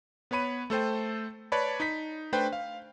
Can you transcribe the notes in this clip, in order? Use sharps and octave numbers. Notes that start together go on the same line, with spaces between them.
B3 B4 C#5 B5 D#7
A3 A4 C5 G5
B4 C#5 D5 A5 B5
D#4 B6
A3 D4 B4 C5 G5
F5